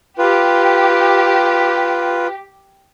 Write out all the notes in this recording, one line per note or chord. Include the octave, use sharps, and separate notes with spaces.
F4 G4 B4